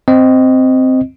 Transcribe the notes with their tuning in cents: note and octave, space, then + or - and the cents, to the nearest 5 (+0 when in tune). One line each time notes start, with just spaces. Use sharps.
C4 -5 D#5 +0